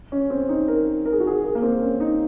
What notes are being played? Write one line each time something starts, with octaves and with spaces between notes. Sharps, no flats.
C#4
C4
D#4
A#4
A#4
G#4
F#4
G#4
A#4
A#3
C4
C#4
D#4